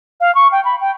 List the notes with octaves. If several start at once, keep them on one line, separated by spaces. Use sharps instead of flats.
F5
C#6
G5
B5
G5